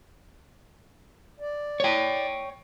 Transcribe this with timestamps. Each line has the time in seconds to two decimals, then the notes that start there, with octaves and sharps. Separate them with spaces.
1.40 D5
1.80 C#5 G5